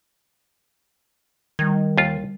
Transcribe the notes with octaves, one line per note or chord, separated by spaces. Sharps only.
D#3 G3 G#6
D#2 F4